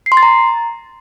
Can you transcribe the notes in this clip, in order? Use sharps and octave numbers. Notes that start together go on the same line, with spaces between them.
C7
C6
A6
A#5